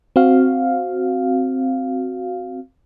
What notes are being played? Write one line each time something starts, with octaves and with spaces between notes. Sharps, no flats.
C4 F#4 F5